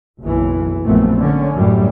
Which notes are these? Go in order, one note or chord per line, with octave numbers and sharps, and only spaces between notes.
F#1 B1 E3
A#1 F#2 A3 B3 C4
D3 C#4
F#2 A2 G3